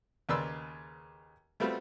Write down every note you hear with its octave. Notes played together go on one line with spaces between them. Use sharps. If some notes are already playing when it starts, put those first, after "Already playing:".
D#2 C#3 B4 D5 C6 E6
G3 A3 B3 C4 F4 F#4